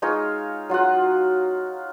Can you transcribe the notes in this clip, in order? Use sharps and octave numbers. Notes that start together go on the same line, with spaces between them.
G#3 D#4 F4 C#5
F#3 F4 F#4 F#5